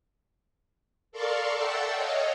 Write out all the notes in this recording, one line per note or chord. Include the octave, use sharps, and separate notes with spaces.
A4 A#4 D5 F5 C6 C#6
E5 F#5 G5 A5 E6
C#5 D#5 F5